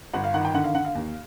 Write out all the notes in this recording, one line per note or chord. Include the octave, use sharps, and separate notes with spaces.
G1 F#5
F5
D#3 F#5
G5
D3 F#5
F5
D3 F#5
F5
D#2